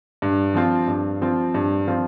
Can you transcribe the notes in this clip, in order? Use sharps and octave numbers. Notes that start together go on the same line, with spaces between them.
G2
F3 C4 F4
G2
F3 C4 F4
G2
F3 C4 F4